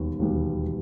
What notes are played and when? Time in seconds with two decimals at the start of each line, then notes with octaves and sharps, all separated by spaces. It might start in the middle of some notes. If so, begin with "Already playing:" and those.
Already playing: E1 D#2 D#3 G3 B3
0.19 E1 D#2 D#3 G3 B3